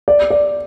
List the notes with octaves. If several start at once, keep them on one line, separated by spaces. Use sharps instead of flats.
D5
D5